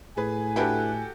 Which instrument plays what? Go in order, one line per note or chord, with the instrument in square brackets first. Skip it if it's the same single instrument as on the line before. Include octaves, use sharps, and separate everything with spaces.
[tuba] A2 [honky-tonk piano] G#4 B4 [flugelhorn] G#5
[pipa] D4 E4 B4 [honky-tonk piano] F#4 G4 A4